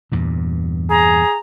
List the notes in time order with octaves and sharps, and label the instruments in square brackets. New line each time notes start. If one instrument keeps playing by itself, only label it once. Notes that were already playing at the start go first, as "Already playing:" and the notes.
[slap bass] E2 G2 A#2
[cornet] G#4 [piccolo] A#5